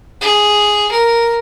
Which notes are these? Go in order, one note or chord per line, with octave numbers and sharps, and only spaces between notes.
G#4
A#4